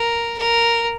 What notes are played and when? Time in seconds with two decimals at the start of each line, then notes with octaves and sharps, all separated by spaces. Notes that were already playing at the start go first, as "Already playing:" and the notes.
Already playing: A#4
0.38 A#4